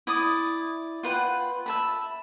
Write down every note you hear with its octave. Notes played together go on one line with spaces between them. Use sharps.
E4 D5 D#6
F4 B4 F#5 G5
E5 A5 B5